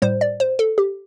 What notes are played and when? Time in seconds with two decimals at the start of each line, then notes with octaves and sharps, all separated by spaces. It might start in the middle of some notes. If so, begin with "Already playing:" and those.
0.02 A2 G3 C5
0.21 D5
0.40 C5
0.59 A4
0.78 G4